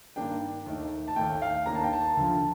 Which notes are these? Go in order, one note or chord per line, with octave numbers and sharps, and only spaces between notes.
G2 D#3 A#3 D4 G5
D#2 D#3 A3 D#4
A5
D#2 D#3 A3 G5
G5
F5
D#2 D#3 A#3 D4 A#5
A5
G5
A5
D2 D3 F3